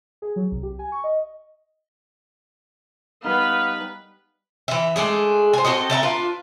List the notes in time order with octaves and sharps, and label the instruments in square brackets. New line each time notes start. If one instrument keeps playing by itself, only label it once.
[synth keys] G#4
F#3
C2
G4
G#5
C#6
D#5
[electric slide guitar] G3 D#4 [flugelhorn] B3 [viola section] B4 [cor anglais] F5
[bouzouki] E3 E5
G#3 A3 D4 G#4
C5 G#5
C4 F#4 A4 D#5
A4 E5 F#5 A#5
D4 F4 B4